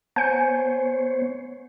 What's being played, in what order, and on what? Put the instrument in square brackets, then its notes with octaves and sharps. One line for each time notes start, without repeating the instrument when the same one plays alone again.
[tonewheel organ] B3 C5 C#5 [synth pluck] G#5 G6 C#7